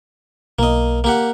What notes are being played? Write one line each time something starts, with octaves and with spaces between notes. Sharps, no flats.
B1 A#3 D#5
A#3 G4 F#5